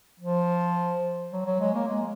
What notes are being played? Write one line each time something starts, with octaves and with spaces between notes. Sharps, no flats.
F3
F#3
F#3
G#3
A#3
G#3